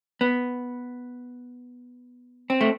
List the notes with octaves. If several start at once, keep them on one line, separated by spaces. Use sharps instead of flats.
B3
C4
A3